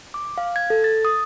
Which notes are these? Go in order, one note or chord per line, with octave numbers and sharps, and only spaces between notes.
D6
F5
G#6
A4
A6
D#6